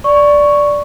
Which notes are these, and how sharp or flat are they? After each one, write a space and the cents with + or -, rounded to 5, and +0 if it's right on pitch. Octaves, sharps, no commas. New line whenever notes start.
D5 -5 C#6 +0